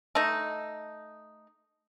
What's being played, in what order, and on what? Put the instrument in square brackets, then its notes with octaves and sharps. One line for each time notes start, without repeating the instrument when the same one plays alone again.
[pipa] A3 D#4